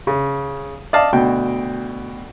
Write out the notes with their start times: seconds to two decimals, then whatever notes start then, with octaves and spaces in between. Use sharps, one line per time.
0.07 C#3
0.93 D5 D#5 F5 A5
1.13 D2 B2 G5